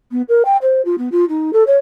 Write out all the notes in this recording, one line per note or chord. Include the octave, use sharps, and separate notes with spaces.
B3
A#4
G5
C5
F4
B3
F4
D#4
A4
C#5